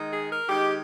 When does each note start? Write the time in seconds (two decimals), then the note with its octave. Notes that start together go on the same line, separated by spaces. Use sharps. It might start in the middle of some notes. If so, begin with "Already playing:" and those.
Already playing: D#3 G#3 D#4
0.11 G#4
0.30 A#4
0.48 D#3 G#3 D#4 G4